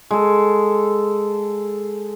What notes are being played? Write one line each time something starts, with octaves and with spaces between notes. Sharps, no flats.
G#3 A4